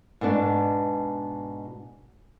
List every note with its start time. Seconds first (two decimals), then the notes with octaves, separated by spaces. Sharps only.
0.21 G#2 B2 B3 D4